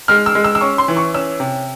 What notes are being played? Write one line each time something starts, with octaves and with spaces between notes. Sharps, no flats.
G#3 F6
E6
G#3
E6
E6
C#4 C#6
C6
E3
C#6
C#4 E6
C3